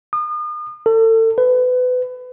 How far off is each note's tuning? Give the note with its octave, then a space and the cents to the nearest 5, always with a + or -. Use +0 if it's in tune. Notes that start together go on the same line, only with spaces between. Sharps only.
D#6 -40
A4 +35
B4 +30